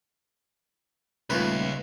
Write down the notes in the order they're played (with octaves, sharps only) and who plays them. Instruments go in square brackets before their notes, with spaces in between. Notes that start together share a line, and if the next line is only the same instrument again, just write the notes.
[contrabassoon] D#1 [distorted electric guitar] C#2 [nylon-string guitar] A3 F4 [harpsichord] B4